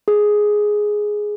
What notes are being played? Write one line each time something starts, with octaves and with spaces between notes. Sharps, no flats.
G#4